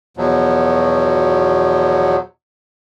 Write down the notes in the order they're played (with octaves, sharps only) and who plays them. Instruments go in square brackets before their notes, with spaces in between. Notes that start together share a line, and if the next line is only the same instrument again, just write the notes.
[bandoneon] E2 B2 F3 F#3